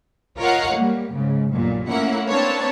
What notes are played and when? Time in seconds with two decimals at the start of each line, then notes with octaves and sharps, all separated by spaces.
0.39 F4 A#4 C#5 D#5 F5 F#5
0.76 G3 A#3
1.14 G#2 C#3
1.53 B1 G2 A#2
1.88 A3 A#3 C#4 E4 A#4 F#5
2.30 A#3 C4 D4 B4 C#5 A5